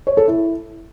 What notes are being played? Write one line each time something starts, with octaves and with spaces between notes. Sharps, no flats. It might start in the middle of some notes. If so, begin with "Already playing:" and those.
C#5
A4
E4